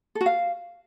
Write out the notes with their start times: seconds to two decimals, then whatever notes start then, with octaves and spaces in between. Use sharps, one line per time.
0.15 A4
0.21 F#4
0.26 F5